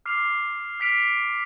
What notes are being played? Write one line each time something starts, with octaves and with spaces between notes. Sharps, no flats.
D6 F6 C7 F7
F6 B6 D7 F7